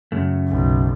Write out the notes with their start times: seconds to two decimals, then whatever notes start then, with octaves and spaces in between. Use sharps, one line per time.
0.12 F#2 C#3 A3
0.47 B1